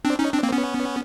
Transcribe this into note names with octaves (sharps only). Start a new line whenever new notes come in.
C4 D4
C#4 D#4
C4 D4
A#3 C4
B3 C#4